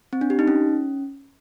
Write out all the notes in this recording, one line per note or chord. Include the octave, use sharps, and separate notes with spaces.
C4
D4
G4
D#4
C#4